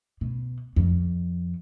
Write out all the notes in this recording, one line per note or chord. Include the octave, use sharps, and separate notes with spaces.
B2
F2